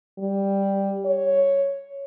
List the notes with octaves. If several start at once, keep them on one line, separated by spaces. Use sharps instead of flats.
G3
C#5